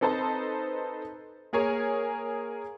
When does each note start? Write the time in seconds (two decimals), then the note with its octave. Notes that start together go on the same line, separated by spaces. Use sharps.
0.01 C4 D#4 A4 B4 C5 A5
1.53 A#3 G#4 A#4 C#5 G#5